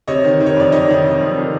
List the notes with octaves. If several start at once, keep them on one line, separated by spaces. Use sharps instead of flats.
C3 C#5 D#5
D#3
D#3
C#5
F2 D5
D#3 C#5 D#5
D#3
C3
F2
D#3